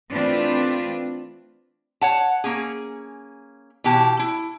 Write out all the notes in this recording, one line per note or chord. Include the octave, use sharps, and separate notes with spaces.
E3 A3 C4 D4 F4 B4
C#5 F#5 A5
A#3 C#4 G#4
B2 E3 G4 A5
E4